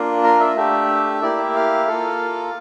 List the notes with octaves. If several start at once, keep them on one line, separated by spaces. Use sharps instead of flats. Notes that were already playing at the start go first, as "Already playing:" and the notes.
Already playing: A#3 D4 F4
A#4
E5
A3 D4 G4 E5
A#3 E4 G4 D5
E5
F5
A#3 F4 A4